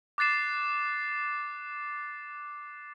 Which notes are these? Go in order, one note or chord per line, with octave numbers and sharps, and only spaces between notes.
D6 F#6 A6 C7 E7